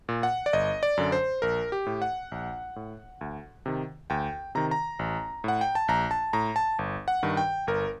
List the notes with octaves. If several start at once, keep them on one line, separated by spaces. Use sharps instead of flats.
A#2
F#5
D5
G1 D#5
D5
F#2 D3
C5
A#1 A#4
G4
A2
F#5
A#1
A2
D2
C3 D#3
D2 G5
C3 D#3 A#5
A#5
A1
A2 F#5
G5
A5
A#1 A#5
A5
A2 A#5
A5
G1
F#5
G2 D#3
G5
G1 A#4